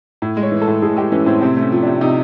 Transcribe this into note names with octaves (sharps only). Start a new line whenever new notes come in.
A2
G#3
C#5
E3
A4
A2
A2 G#4
G#3 G4
E3 C#4
A2 C4
C3 C4
A3 C#4
F3
C3 D4
C3 D#4